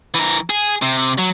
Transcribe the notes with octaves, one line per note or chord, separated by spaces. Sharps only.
E3 A#4
G#4
C3
F#3